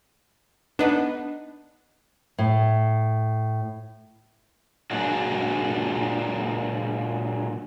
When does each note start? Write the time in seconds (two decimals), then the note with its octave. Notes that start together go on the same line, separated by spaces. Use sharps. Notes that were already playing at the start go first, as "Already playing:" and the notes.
0.79 B3 D4 D#4 B4
2.38 A2
4.91 A#2 F#3 G#3 A#3 D4 F#4